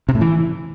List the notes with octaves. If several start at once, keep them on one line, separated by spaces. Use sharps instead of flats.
C3
A2
E3